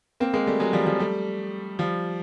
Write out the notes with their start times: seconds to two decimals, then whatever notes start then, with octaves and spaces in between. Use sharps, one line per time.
0.20 A#3 C4
0.34 G#3 A#3
0.47 G3 A3
0.60 F#3 G#3
0.73 F3 G3
0.86 F3 G3
0.99 G3 A3
1.79 F3 G3